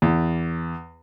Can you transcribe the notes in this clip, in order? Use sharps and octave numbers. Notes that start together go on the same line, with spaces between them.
E2